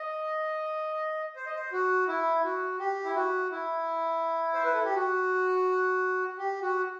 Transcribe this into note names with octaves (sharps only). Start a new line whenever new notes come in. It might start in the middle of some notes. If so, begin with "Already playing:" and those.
Already playing: D#5
C5
D#5
C5
F#4
E4
F#4
G4
E4
F#4
E4
C5
B4
A4
G4
F#4
G4
F#4